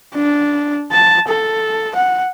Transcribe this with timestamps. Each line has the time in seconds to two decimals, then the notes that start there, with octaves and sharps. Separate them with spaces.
0.15 D4
0.92 A5
1.28 A4
1.95 F#5